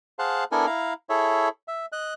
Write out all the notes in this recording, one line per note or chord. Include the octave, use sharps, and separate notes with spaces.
G#4 C5 F5 F#5 A5
B3 D4 E4 A4 A#4 G#5
E4 F5 A#5
E4 G#4 A4 C#5 E5
E5
D#5 F#6